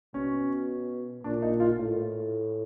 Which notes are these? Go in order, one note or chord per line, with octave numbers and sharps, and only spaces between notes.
B2 C#4
A#2 D4
D#4
F4
A2